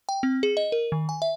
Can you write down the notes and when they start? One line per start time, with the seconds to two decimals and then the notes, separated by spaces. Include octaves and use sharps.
0.09 G5
0.23 C4
0.43 G#4
0.57 D#5
0.72 A#4
0.92 D#3
1.09 G#5
1.22 E5